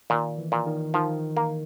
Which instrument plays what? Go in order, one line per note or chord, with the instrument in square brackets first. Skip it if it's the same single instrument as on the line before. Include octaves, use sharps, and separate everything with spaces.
[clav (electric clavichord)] A#2 [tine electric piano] D#3
[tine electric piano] E3
[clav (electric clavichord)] A#2
[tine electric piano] D#3
[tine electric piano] D#3 [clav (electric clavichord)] F3
[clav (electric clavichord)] A#3